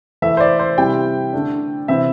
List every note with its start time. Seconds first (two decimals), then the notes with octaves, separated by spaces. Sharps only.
0.22 E3 A3 E4 E5
0.37 C5
0.40 D5
0.59 C5
0.78 C3 G3 E4 G5
1.33 D3 A3 D4
1.88 C3 E3 C4 E4 E5